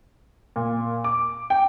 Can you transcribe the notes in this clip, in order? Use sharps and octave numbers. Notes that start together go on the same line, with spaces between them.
A#2
D6
G5